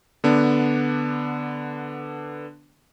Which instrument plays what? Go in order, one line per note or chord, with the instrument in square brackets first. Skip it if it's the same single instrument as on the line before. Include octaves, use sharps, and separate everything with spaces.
[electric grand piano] D3 B3 D4